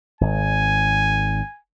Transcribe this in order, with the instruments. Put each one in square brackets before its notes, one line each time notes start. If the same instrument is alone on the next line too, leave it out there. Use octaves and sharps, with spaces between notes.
[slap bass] G#1 [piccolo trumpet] G#5